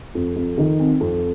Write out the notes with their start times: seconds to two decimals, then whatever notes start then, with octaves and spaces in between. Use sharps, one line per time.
0.15 F2
0.36 F2
0.58 D#3
0.79 C4
1.01 F2